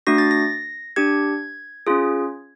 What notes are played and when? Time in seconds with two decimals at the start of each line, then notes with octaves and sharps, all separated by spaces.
0.07 A3 D4 F#4 A#6
0.18 A6
0.31 A#6
0.96 D4 G4 G#6
1.87 C#4 F4 G#4